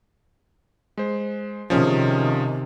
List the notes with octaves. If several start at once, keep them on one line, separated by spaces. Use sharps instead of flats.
G#3 C5
C3 D#3 F3 C#4 G#4